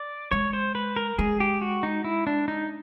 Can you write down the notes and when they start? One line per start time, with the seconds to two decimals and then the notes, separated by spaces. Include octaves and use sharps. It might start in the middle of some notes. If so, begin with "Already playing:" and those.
Already playing: D5
0.32 G#3 C#5
0.53 C5
0.75 B4
0.96 A#4
1.18 G#3 G#4
1.40 G4
1.62 F#4
1.83 D#4
2.04 E4
2.27 D4
2.48 D#4